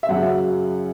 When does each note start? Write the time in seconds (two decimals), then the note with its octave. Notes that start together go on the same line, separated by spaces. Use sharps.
0.03 E5
0.09 F#2 C#3 F#3 F#5